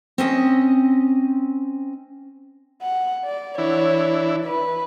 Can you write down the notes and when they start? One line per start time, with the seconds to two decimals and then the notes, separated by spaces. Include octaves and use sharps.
0.18 C4 C#4 D#5
2.82 F#5
3.25 D5
3.58 E3 D4 E4 C#5
4.45 B4